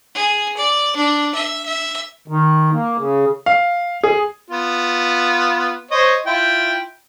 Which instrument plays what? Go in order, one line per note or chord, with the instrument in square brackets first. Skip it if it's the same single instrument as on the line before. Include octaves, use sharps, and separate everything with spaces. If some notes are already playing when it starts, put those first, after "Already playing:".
[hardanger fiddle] G#4
D5
D4
E5
E5
[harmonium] D#3
A#3
C#3
[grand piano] F5
G#4
[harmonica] B3 F4
C5 C#5 D#5
E4 F4 G5